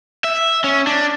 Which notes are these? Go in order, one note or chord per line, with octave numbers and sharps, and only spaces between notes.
E5
C#4
D4